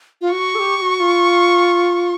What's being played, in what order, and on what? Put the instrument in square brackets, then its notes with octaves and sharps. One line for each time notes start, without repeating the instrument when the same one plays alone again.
[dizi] F4
[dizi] F#4 [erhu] C#6
[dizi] A4
G4
G4
F#4
F4